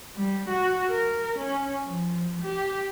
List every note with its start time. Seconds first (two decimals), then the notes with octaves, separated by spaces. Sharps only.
0.16 G3
0.49 F#4
0.89 A#4
1.39 C#4
1.86 F3
2.43 G4